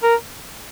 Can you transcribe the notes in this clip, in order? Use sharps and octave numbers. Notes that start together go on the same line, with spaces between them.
A#4